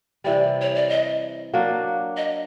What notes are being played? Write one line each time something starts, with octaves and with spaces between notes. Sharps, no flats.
C3 E3 G3 D5
C#5
D5
D#5
F#3 A#3 D4
D#5